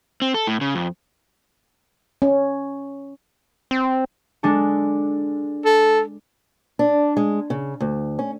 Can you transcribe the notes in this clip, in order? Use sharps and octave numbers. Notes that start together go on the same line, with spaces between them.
C4
A4
A2
C#3
F2
C#4
C4
G#3 D4 A4
A4
D4
G#3
C#3
D2
C#4